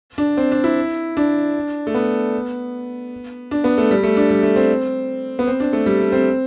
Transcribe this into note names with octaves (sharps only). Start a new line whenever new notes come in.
D4
C4
D4
E4
D4
A3
B3
D4
B3
A3
G3
A3
D4
G3
A3
C4
B3
C4
D4
A3
G3
A3
C4